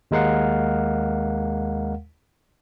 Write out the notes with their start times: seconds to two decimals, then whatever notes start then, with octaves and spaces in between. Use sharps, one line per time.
0.11 D#2 G#3 A#4 F5 F#5